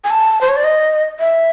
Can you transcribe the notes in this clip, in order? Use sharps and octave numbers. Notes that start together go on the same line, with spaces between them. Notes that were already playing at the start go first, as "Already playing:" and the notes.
G#5
A5
C5
C#5
D5
D#5
E5